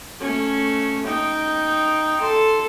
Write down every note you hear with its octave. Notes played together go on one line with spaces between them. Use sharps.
A3 C#4
D#4 G5
A4 C6